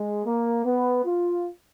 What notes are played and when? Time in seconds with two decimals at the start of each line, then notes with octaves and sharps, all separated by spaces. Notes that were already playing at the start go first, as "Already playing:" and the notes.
Already playing: G#3
0.26 A#3
0.65 B3
1.05 F4